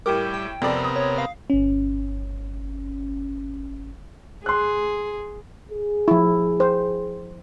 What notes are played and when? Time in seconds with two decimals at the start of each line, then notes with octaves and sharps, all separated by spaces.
0.06 A2 G3 G4 A#4 D6
0.34 G5
0.62 F2 C3 B3 A4 A#4 D5
0.84 D#6
0.96 C#5
1.18 F5
1.50 G1 C#4
4.46 G#4 C6 F#6
5.72 G#4
6.08 F3 E4
6.60 C5